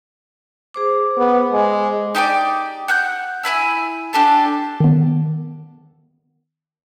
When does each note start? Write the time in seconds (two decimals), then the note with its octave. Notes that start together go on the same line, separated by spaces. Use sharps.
0.74 G#4 C5 D6
1.18 B3
1.53 G#3
2.15 D#4 G4 B4 D5
2.88 F#5 F#6 G6
3.43 E4 G#5 B5 E6
4.13 D4 G4 A4 A5
4.80 D#3 B3